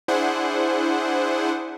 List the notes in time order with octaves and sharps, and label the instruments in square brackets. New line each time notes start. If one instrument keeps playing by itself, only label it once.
[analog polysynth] D4 E4 G#4 C5 F#5